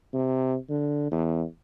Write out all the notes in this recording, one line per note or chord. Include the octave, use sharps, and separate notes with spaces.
C3
D3
E2